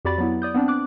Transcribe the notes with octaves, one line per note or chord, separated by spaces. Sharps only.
F2 F#4 G4 D5 B5 A6
F#3 B3 E4
D5 D#6 G6
B3 C4 D4 D5
D6 F#6